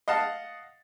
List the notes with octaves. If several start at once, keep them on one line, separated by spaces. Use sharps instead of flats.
D#5 F5 F#5 A5